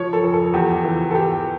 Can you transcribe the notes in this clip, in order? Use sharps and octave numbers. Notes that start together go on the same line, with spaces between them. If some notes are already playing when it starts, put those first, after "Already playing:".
Already playing: F3 C#5
A4
F2
A4
E2 G4
E3
A4
E2 G4